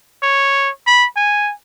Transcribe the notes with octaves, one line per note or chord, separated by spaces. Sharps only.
C#5
B5
G#5